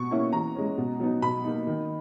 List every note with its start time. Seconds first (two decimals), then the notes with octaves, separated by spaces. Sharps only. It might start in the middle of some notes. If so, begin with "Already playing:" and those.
Already playing: B2 C#6
0.11 A#3 C#4 E4
0.32 E3 A#5
0.55 G#3 C#4
0.78 B2
1.00 F#3 B3 D#4
1.22 B2 B5
1.44 A#3 D#4
1.67 D#3